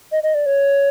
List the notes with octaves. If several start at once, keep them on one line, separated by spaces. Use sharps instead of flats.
D#5
D#5
D5
C#5